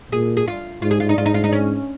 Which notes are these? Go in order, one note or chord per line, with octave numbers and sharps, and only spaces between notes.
A#2 G#4
G#4
F4
G#2 F4
G#4
F4
D#4
G#2 F4
D#4
F4
D#4
C#4